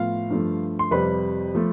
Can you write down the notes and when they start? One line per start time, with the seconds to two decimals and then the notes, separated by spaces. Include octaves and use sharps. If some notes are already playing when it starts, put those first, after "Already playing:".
Already playing: A2 F3 B3 F4 F5
0.30 G2 F3 A3
0.79 C6
0.91 F2 C3 G3 B4 B5
1.55 F3 A3